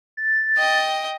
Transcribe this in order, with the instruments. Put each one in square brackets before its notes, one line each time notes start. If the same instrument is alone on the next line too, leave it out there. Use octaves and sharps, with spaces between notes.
[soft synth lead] A6
[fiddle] D#5 G5